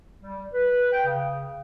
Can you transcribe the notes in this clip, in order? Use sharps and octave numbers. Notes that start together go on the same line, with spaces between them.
G3
B4
G5
C#3